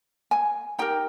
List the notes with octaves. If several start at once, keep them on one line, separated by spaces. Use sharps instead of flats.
G#5
D#4 G4 A#4 G5